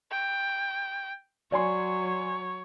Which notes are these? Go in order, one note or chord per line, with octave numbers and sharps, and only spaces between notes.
G5
F#3 C#5 D5 G#5 C6